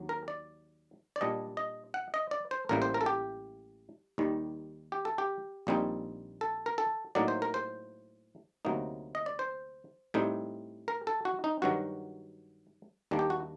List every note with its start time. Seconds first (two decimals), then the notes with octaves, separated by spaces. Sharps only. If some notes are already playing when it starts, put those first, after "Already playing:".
Already playing: D#2 F#3
0.09 A#4
0.28 D5
1.16 D5
1.21 A#2 G3 D4 D#5
1.57 D#5
1.94 F#5
2.14 D#5
2.31 D5
2.51 C5
2.69 A1 A2 G3 A#3 A#4
2.82 C5
2.94 A#4
3.01 A4
3.06 G4
4.18 D#2 D#3 G3
4.92 G4
5.05 A4
5.18 G4
5.67 A#1 A#2 G3 C4 D#4
6.41 A4
6.66 A#4
6.78 A4
7.15 A2 F#3 A#3 D#4 D5
7.28 C5
7.42 A#4
7.54 C5
8.65 D2 C3 F#3 A#3 D#4
9.15 D#5
9.26 D5
9.39 C5
10.14 A2 G3 C4 D#4
10.88 A#4
11.07 A4
11.25 F#4
11.44 D#4
11.62 G2 D#3 F#3 F#4
13.11 D#2 D#3 G3 A#3 D4
13.19 G4
13.30 F#4